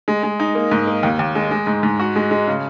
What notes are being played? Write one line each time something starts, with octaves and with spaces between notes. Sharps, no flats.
G#3
G#3
D#4
A#3
G#2
A#3
D#2
D#2
G#3
G#3
G#2
G#2
F#4
G#3
G#3
C#3